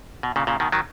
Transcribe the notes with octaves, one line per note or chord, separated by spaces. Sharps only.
B2
A#2 C#3
A#2 C#3
B2 D#3
D#3 F#3